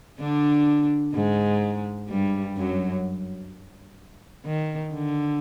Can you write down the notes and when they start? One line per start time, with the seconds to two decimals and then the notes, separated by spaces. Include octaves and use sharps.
0.19 D3 D4
1.14 G#2 G#3
2.09 G2 G3
2.57 F#2 F#3
4.46 D#3
4.93 D3